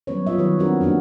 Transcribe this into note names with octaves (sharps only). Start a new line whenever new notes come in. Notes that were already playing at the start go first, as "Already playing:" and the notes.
F#3 G3 B3 C#4 B4 C#5
B3 F4 D#5 E5
D#3 F#3 G4 B4 C#5
B3 C4 D4 F#4 A#4
A#3 D4 D#4 F#4 G4